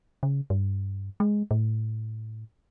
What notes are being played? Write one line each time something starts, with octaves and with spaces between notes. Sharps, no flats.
C#3
G2
G#3
A2